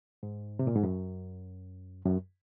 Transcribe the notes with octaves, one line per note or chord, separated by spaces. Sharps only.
G#2
C3
A#2
G#2
F#2
F#2